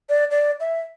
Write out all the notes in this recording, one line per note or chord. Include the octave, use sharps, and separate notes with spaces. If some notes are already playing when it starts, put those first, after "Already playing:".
D5
D5
E5